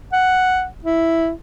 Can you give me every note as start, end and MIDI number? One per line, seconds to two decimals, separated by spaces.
0.13 0.65 78
0.85 1.31 64